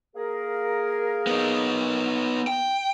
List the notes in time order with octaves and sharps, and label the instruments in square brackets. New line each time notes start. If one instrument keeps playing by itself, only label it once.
[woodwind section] A#3 G#4 A#4
[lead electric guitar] B3 D#4
G5